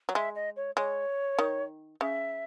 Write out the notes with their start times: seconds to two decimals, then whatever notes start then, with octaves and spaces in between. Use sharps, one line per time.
0.09 F#3
0.15 G#3 E5
0.35 D#5
0.56 C#5
0.76 G#3 C#5
1.39 D#3
2.01 C#3 E5